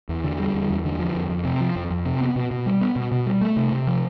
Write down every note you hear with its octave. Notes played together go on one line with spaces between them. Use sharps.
E2
D3
G3
E2
E2
D3
F3
F2
F2
C3
F3
F2
F2
C3
B3
B2
B2
G3
B3
B2
B2
G3
A3
C3
C3
F3